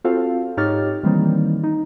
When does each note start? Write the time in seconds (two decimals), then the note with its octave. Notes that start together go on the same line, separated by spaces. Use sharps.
0.04 C4 F4 F#4 A4 C5 F5
0.57 G#2 D#4 G4 C#5 F6 A6
1.03 D#3 E3 G3 A#3 C4 D#4
1.64 D#4